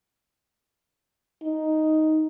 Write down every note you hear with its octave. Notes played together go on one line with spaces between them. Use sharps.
D#4